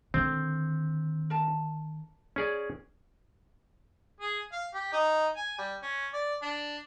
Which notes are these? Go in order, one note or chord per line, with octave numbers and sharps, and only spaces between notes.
D3 D#3 C4
A#4 A5
C#4 G#4 D5
G#4
F5
G4
D#4
G#5
G3
C#4
D5
D4